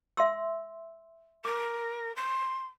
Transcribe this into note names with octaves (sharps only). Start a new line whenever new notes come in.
E5 C6 E6
A#4 D6
C6